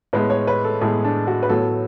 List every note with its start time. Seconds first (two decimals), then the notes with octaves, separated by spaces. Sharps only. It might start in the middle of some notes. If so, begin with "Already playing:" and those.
0.13 A2 G#3 B3 B4
0.30 C#5
0.47 B4
0.64 A4
0.81 A2 G#3 B3 G#4
1.05 D4
1.27 F#4
1.43 B4
1.49 A2 F#3 B3 A4